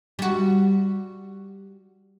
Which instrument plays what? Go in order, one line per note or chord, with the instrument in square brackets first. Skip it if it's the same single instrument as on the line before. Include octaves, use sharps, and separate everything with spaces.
[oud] G3 F#4